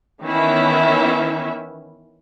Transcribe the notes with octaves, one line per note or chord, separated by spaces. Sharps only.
D#3 E3 B3 C#4 E4 E5